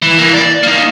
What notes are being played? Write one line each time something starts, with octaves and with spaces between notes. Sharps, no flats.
E3
E3 A#3
D5
A#3 D#4